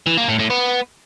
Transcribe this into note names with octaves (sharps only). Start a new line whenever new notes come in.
E3
A#3
A2
A2
B3